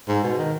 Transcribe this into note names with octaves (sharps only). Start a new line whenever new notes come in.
G#2
B2
D#3